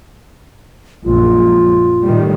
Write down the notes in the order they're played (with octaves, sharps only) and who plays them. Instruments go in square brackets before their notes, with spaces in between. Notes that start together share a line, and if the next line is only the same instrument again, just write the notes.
[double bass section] A#1 F#2 G#3 [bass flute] F4
[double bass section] A2 D#3 G3